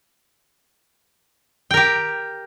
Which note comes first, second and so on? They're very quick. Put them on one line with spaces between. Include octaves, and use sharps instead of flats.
G5 A#4 G4